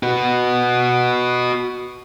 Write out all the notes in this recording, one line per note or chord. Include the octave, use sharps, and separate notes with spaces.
F#4 B4